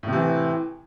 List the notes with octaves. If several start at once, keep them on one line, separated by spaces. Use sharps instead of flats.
A2 C3 E3